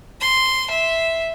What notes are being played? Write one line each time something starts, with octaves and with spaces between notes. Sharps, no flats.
C6
E5